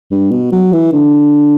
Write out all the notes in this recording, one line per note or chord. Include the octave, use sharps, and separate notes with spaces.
G2
B2
F#3
E3
D3